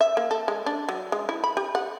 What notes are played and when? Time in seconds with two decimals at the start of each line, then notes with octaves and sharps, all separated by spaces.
0.01 E5
0.17 A#3
0.31 A4
0.48 G#3
0.66 D4
0.89 F#3
1.12 G#3
1.29 E4
1.44 B5
1.57 G4
1.75 F#5